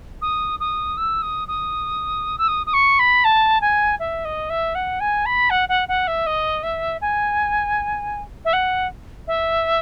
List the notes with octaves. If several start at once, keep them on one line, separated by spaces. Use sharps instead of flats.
D#6
D#6
E6
D#6
D#6
E6
D#6
D#6
C#6
B5
A5
G#5
E5
D#5
E5
F#5
G#5
B5
F#5
F#5
F#5
E5
D#5
E5
G#5
E5
F#5
E5